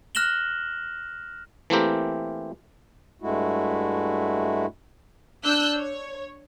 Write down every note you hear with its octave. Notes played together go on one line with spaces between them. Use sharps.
F6 F#6 A#6 E7 F#7 G7
E3 A3 A#3 C4 G4 A#4
G2 G#3 A3 E4 F#4
D4 E6 F#6 G6
C#5